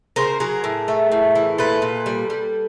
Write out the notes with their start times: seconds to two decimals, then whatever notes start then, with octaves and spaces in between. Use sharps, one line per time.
0.16 C#3 A#4 C5
0.40 F#3 G#4 A#4
0.64 A2
0.88 A3
1.12 A2
1.36 E3
1.58 A#2 A4 B4
1.82 A#2
2.06 G3
2.30 G3